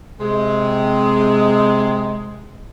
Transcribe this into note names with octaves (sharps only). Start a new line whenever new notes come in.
C3 G#3